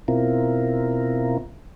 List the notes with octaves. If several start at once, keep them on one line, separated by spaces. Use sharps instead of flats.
B2 C4 E4 F4 A#4